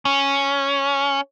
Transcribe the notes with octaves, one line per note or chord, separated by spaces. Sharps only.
C#4